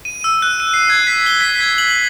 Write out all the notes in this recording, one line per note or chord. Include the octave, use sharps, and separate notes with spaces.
D#7
E6
F#6
D#7
C7
G#6
B6
G7
B6
G#6
F#7